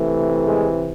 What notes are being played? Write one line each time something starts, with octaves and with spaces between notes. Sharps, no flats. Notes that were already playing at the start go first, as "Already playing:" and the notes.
Already playing: C3 E3 A3
G#3 G#4